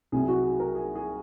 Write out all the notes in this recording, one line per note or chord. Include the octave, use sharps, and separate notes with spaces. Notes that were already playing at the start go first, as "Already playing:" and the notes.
C2 C3 F#3 G#4
F#4
G#4
A#4
G#4
G#4